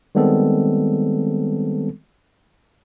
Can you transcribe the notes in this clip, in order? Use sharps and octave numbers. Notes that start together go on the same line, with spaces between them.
D#3 G3 G#3 B3 C4 A4